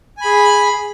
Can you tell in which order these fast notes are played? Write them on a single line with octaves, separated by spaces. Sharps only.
G#5 B5 G#4